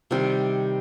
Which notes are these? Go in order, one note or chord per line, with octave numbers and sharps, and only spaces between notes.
C3 D#3 G3